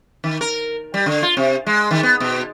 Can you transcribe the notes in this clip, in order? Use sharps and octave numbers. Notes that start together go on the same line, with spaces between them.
D#3
A#4
G3
D3
F4
C3
G#3
D#3
B3
B2